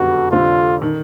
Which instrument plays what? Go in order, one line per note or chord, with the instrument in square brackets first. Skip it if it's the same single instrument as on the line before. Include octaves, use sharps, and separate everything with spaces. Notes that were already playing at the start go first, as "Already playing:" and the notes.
Already playing: [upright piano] F#1 F2 D3 G3 B3 [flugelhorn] F#4
[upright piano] F1 F2 D3 G3 C4 [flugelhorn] F4
[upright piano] D#3